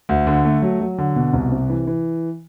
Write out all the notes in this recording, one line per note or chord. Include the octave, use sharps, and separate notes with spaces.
D2
D3
A3
F#3
F#3
D3
B2
C2
C3
E3
E3